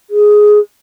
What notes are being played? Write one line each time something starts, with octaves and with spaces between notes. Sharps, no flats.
G#4